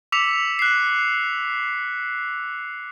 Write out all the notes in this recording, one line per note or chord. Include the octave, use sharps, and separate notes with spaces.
D6 E6 B6 C#7 F7
F#6 C7